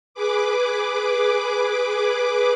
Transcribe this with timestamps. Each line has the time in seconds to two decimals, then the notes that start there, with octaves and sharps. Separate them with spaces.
0.14 G#4 B4 D6